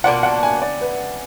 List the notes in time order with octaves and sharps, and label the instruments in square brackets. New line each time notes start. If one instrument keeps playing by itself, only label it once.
[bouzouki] B2 A#3 D4 F4 [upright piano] F#5
[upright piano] F#5
G#5
D5
B4